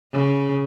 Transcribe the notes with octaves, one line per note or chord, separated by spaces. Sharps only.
C#3